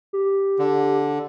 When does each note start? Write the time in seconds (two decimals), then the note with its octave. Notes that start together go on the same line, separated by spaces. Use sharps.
0.13 G4
0.59 D3